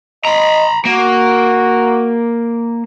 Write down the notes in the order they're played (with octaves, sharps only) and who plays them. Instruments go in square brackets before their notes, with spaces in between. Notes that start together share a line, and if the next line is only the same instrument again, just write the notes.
[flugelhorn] D#5 [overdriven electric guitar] A#5 B5
[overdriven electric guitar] A#3 [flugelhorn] F#4